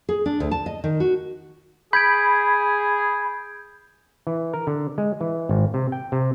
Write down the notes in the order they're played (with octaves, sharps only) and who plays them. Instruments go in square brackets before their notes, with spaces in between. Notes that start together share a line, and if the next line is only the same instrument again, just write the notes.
[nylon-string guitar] G#4
D4
D2
A5
D#5
D#3
F#4
[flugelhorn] G#4 [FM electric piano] B5 [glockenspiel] G6 G#6 D7
[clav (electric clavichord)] E3
A#4
D3
G#3
E3
G#1
C3
G5
C3